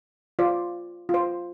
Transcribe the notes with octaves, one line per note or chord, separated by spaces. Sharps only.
F4 C5 D5
F4
C5